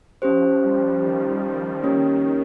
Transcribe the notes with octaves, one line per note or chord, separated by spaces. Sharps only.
F3 C#4 G4 C5
G3
D#3
D#3 A#3 C#4 G4 A#4 C#5